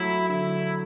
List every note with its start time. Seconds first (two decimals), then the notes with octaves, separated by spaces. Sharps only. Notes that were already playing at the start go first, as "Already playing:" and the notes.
Already playing: F#3 A3 E4
0.29 D3 E4